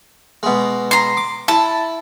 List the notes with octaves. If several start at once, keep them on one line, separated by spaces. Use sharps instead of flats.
B2 G#3
A#5 C6
D6
E4 A5